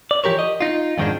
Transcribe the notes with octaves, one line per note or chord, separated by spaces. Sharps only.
D5
E3 F3 G4 A#4 C#5
D#5
D#4 F4
F2 G#2 D#3 F3 G#3 D4